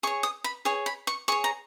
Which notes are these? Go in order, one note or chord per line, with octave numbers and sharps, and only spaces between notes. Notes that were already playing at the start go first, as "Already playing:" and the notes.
G#4 C#5 C#6
D#6
B5
G#4 C#5 G#5
B5
C#6
G#4 C#5 C#6
A#5